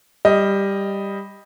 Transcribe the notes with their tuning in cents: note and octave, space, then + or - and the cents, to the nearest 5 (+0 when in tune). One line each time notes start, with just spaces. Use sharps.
G3 +10 D#5 +0